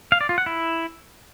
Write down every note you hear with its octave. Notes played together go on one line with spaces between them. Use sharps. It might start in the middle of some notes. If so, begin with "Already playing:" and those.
F5
D5
F4
F#5
E4